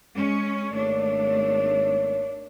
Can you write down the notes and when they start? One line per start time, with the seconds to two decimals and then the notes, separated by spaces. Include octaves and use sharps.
0.16 G#3 C#4
0.72 G#1 A3 A#3 D4 C#5